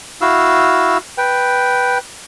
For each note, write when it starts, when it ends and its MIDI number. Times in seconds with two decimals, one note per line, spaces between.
0.21 0.98 64
0.21 0.98 66
0.21 0.98 77
0.21 0.98 88
1.18 1.98 71
1.18 1.98 79